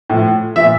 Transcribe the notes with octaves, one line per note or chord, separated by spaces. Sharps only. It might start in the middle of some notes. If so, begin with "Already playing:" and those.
A2 F3
A#2 F3 E5